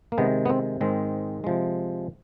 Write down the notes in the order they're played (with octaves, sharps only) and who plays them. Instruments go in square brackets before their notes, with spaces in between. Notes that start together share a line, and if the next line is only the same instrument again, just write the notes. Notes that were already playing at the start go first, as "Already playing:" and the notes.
[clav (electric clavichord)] A#3
C3 D#3 G#3 B3
B3
C4
G#2 D#3 G#3 C4
C3 F3 G#3